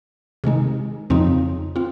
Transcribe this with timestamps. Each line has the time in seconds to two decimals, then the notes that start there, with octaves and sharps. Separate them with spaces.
0.44 C3 D#3 G#3 D#4
1.10 F2 C#3 F3 C4 D#4
1.76 C4 F4